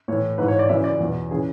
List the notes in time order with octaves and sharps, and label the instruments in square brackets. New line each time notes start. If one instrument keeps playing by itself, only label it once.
[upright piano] A2 E3 C#5
G#2 E3 B4
C#5
D5
F#2 C#3 E3 E5
D5
E2 B2
C#3 E3 G#4